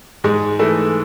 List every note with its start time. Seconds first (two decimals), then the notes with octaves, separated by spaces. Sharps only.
0.24 G#2 G#3
0.59 E3 A3